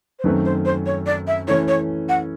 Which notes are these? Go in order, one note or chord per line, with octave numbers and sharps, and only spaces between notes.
C5
F#2 D#3 F#3 A3 C4 B4
C5
C5
C#5
D5
E5
E3 A3 C#4 C#5
C#5
F#5